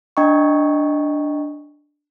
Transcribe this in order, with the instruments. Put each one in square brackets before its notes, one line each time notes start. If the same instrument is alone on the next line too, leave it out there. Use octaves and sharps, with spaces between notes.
[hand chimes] D4 D#5 G5 A#5 C#6